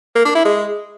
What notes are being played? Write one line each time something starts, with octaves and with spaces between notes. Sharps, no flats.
A#3
D4
E4
G#3